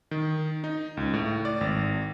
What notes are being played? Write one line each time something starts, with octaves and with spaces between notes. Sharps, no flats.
D#3
D#4
C#2
A2
D5
G#1